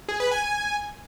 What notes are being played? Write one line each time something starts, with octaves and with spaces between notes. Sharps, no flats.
G#4
B4
G#5